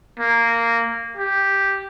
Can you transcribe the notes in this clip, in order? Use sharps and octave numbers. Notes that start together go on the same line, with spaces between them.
A#3
G4